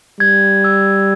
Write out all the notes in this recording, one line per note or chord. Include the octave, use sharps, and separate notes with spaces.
G3 G#6
E6